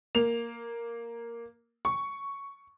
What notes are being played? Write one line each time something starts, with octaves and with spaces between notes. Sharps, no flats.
A#3 F7
C#6